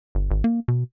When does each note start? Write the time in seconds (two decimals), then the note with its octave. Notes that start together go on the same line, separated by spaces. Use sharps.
0.15 G1
0.31 G#1
0.44 A#3
0.68 B2